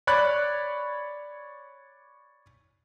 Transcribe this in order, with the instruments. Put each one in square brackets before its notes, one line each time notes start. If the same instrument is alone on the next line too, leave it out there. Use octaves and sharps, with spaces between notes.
[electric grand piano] C#5 D5 B5 F#6